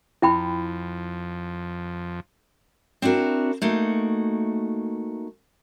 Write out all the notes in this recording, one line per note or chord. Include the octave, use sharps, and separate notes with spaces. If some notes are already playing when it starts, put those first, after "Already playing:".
F2 E4 G5 B5
C4 D4 E4 F#4 A#4
A3 A#3 D#4 F#4